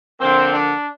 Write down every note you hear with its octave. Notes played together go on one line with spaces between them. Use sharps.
D3 F3 A#3 C4
D4